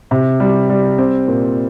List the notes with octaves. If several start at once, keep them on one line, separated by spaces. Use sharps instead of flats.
C3
G3
G3
C4
A#2